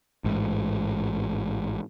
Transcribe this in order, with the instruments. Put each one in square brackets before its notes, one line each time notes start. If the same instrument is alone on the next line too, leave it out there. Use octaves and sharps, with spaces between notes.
[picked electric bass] A1 G#2